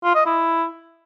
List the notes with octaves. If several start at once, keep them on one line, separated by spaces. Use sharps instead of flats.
F4
D#5
E4